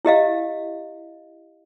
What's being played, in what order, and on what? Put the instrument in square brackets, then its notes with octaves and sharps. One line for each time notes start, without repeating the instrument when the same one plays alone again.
[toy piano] E4 G4 D#5 F5